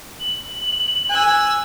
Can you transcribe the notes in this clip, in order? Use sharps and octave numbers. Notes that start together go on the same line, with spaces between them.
F#7
G#5 E6 F#6